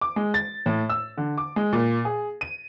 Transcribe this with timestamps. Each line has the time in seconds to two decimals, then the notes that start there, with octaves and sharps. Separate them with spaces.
0.01 D6
0.16 G#3
0.34 A6
0.66 A2
0.90 E6
1.18 D3
1.38 D6
1.56 G#3
1.73 A#2
2.05 G#4
2.41 D#7